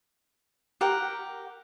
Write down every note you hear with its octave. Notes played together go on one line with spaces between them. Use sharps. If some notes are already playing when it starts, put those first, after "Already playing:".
G4 A#4 F#5